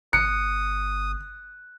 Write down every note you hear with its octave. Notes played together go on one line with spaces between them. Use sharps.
G1 D#6 F#6 C#7